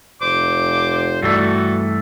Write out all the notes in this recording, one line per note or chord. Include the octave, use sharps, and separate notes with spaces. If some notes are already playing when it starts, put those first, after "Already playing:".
F1 C5 D6
G2 E3 A3 F#4 A4